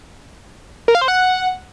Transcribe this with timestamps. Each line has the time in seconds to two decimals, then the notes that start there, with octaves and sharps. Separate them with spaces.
0.88 A#4
0.95 F5
1.01 C5
1.08 F#5